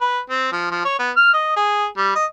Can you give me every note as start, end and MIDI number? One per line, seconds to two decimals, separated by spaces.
0.01 0.19 71
0.30 0.51 60
0.52 0.67 53
0.71 0.83 53
0.85 0.98 73
0.99 1.11 59
1.17 1.33 89
1.33 1.56 75
1.57 1.86 68
1.97 2.11 55
2.16 2.25 75